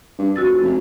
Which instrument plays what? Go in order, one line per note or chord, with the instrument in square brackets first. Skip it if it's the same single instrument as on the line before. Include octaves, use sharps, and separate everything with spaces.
[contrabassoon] G2
[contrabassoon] F1 [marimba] F#4 E6 A6
[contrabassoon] F1